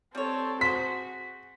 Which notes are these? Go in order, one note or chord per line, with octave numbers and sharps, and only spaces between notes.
G3 C4 A4 C#5
F#4 G#4 C5 B6